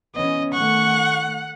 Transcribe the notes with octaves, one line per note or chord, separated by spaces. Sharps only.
E3 B3 C#4 D#5
D#3 A3 F#5 C#6